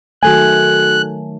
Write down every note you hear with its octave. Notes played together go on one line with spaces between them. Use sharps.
D#3 F#3 A3 F#4 A4 G#5 F#6 G#6